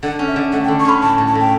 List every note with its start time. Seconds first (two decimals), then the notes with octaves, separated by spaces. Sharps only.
0.03 D3 F#5
0.19 C#4
0.28 E5
0.36 D3
0.52 A3 F#5
0.64 G5
0.68 D3
0.80 C#6
0.85 C#4 B5
1.02 A2 A5
1.18 A2
1.27 A5
1.35 A2 G5